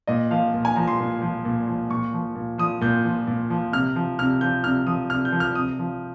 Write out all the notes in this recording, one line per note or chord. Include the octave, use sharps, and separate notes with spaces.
A#2 D#5
F3 F5
A#2
G#5
F3 A#5
C6
A#2
F3
A#2
F3
A#2 C#6
F3
A#2
F3 D#6
A#2 G6
F3
A#2
F3
C3 F6
F3
C3 F6
F3 G6
C3 F6
F3 D#6
C3 F6
G6
F3
F6
C3 D#6
F3